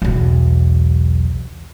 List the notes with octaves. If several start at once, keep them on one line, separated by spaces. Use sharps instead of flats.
B1 E2